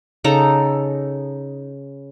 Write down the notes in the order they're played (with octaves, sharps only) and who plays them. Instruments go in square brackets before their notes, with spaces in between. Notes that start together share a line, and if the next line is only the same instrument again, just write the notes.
[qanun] C#3 D#4 A4 A#5